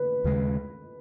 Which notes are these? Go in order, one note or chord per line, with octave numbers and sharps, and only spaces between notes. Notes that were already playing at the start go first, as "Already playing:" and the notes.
Already playing: B4
D#2 C#3 G#3